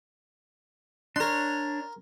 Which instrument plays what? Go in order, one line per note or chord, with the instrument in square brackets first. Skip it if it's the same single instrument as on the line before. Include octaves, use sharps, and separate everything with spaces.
[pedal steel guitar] D4 C#5 [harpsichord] A#4 C6